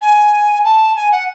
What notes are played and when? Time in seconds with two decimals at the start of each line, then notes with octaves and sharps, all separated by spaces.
0.02 G#5
0.64 A5
0.96 G#5
1.12 F#5